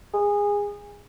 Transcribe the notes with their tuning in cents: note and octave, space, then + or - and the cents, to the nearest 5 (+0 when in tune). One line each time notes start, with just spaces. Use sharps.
G#4 -20